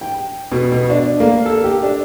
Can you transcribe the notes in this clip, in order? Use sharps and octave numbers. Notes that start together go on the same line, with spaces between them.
G5
B2
B2
D4
A#3
A4
G4
D4